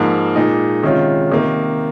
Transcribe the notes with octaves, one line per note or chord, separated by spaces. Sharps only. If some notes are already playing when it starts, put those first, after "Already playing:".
Already playing: G#2 F3 A#3
A#2 G#3 D#4
C3 D#3 G#3 C#4 F4
C3 D#3 A#3